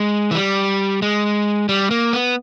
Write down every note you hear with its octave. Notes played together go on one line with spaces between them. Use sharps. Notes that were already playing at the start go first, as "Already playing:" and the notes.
Already playing: G#3
E3
G3
G#3
G3
A#3
B3